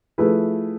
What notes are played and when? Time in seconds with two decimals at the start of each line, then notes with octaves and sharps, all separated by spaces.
0.18 F3 A3 E4 G#4 B4